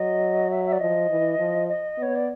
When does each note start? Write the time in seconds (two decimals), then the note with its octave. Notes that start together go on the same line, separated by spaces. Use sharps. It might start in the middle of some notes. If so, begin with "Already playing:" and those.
Already playing: F#3 D#5
0.51 E5
0.65 E5
0.72 D5
0.80 F3 D#5
1.10 E3
1.39 F3
1.68 D#5
1.98 B3 C#5
2.16 D5